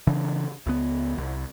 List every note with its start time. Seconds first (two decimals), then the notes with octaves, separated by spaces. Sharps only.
0.07 C#3 E3 D4
0.67 C#2 B3
1.18 C2